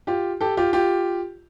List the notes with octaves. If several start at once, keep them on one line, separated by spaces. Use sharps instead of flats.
F4 G4
G4 A4
F4 G4
F4 G4